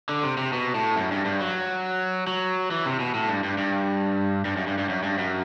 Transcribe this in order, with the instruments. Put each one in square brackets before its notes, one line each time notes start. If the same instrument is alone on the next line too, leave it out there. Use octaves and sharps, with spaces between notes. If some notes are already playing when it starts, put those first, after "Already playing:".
[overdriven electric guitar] D3
C3
C3
B2
A2
F#2
G2
G2
F#3
F#3
E3
C3
B2
A2
G2
G2
G2
G2
F#2
G2
G2
F#2
G2
F#2